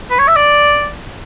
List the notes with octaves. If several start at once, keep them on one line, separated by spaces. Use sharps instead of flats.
B4
C#5
E5
D5